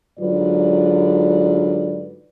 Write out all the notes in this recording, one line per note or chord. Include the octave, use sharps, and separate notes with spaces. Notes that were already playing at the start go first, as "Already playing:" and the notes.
G#2 D3 F#3 F4 B4 D5